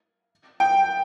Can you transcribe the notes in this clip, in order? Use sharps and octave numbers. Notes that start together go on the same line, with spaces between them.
G5